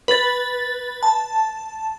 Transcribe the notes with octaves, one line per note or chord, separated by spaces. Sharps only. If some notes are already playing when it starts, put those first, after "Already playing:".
B4 A6
A5